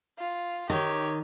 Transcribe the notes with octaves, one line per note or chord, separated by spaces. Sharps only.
F4
D#3 G4 C#5